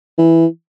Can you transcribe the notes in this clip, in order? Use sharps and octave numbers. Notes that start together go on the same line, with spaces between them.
E3